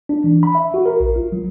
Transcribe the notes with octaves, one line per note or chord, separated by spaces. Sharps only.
D4
E3
B5
E5
F#4
A#4
A#1
F4
F#3